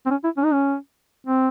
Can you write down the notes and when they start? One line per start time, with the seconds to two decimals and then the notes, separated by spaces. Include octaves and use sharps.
0.06 C4
0.11 C#4
0.24 E4
0.37 C#4
0.44 D#4
0.53 C#4
1.27 C4